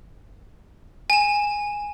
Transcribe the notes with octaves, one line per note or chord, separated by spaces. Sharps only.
G#5 E7